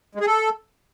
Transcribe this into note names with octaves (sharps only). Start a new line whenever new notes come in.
G#3
G#4
A4